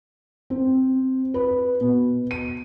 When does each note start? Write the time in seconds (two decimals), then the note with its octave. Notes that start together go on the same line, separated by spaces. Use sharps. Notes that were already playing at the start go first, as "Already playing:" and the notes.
0.50 C4
1.34 B4
1.81 B2
2.31 D#7